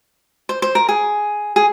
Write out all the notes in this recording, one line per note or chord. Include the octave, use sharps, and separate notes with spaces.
C5
C5
A#4
G#4
G#4